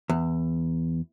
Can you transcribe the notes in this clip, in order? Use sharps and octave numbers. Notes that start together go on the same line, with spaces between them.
E2